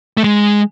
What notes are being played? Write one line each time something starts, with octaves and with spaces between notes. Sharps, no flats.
A3
G#3